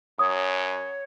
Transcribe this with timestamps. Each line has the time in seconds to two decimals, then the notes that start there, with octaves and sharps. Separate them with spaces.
0.19 F#2 C#5 D#6